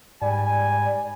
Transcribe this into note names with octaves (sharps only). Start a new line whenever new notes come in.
G#2 G3 D5 G#5